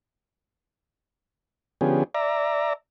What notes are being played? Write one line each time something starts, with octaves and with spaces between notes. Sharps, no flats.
D3 F3 B3 C#4 G4 G#4
D5 E5 A#5